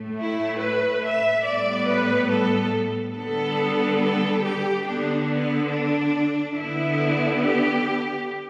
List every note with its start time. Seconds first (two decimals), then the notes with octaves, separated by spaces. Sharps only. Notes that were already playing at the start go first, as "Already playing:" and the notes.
Already playing: A2 A3
0.18 E4
0.60 B4
1.03 E5
1.46 A2 G3 B3 D5
1.88 B4
2.30 A4
3.16 D3 G3 B3 A4
4.01 A4
4.44 G4
4.86 D3 B3 D4
5.29 B3
5.71 D4
6.56 D3 B3 E4
7.41 G4